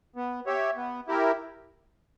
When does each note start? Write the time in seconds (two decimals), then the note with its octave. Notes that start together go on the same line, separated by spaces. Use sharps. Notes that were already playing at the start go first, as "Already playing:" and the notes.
0.16 B3
0.46 G4 C#5 E5
0.76 B3
1.08 E4 G4 A#4